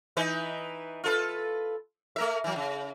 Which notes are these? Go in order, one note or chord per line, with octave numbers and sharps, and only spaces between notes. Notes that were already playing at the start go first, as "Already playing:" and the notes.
E3 D#4 B4
F4 A4 B4
A3 A#4 E5
E3 F#3
C#3